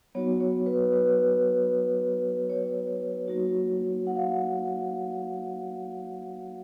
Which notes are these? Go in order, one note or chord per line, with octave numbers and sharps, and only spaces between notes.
F#3 B3 D#4 F#4 C#5
C#5
B4
B4
C#5
F#3 A#3 D#4 F#4
F#5
F5